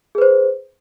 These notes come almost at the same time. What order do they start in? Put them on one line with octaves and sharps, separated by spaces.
G#4 B4 C5